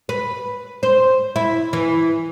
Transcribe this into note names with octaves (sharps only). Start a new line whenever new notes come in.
B4
C5
E4
E3